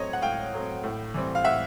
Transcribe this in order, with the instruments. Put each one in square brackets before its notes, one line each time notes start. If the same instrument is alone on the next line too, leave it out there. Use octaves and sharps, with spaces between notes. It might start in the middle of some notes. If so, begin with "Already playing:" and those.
Already playing: [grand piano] A2 F#3 A3 C4 C#5 D#5
F#5
A2 F5 G5
F#3 A3 C4
A2
E3 G3 C4
F5
A2 E5 F#5